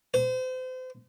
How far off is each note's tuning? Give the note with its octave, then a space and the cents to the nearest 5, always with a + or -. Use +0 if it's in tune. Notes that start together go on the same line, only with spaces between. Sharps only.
C5 -35